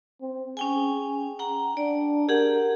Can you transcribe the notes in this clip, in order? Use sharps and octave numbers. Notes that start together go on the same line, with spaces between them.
C4
C#4 G#4 G5 G#5
F#5 G5 A#5
D4 D5
G4 G#4 A#4 F#5